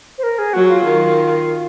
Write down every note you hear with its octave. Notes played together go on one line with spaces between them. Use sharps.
C5
A#4
G#4
F#3 F#4
F4
D#3